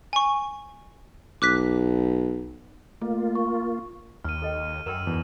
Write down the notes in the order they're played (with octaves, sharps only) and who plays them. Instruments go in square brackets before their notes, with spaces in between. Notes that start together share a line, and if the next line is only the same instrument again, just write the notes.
[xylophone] G#5 C#6
[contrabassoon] B1 [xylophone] D6 F#6 B6
[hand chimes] A3 [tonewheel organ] A#3 F4
[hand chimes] C#6
[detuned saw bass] D#2 [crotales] F6 D#7
[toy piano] A4 D#5 G5
[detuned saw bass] F#2 [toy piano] A#4 G5 [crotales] E6 D#7 E7
[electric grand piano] E2